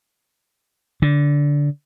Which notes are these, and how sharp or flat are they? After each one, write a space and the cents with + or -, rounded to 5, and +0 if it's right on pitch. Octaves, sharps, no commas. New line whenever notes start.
D3 -15